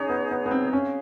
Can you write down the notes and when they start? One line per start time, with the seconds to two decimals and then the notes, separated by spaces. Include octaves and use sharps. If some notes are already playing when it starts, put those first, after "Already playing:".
Already playing: C#4 D#4 G#4 C#5
0.09 B3
0.31 B3
0.46 B3
0.51 C4
0.73 C#4 G#4 C#5 F5